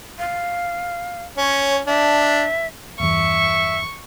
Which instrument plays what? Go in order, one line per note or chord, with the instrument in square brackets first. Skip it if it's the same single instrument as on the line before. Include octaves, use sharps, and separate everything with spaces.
[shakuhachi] F5
[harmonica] C#4 [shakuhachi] C#5
[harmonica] D4 [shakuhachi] E5
[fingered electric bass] E2 G2 E3 [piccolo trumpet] E5 [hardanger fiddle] C#6